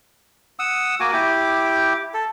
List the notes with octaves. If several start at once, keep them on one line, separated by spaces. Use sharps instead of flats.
F#5 D#6 E6
A#3 F#4 G#5 D6
E4 G4 D6
A4